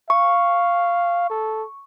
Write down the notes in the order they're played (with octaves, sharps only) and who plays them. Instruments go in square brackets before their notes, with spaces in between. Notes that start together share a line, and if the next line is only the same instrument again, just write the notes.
[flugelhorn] F5 [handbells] C#6
[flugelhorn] A4